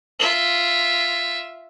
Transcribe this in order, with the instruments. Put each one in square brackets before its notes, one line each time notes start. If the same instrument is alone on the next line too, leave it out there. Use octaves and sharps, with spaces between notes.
[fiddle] F4 E5